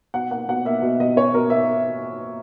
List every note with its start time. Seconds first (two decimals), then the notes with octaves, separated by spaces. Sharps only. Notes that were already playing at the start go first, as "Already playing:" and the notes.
0.14 B2 F#5
0.31 A#3 F#5
0.48 B2 F#5
0.65 A#3 E5
0.82 B2 D#5
1.00 B2 D#5
1.16 C#4 C#5
1.34 B2 A#4
1.50 A#3 E5